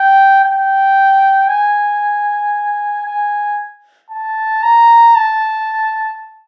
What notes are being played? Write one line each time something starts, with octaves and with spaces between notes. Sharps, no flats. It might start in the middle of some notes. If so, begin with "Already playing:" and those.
Already playing: G5
G5
G#5
G#5
A5
A#5
A5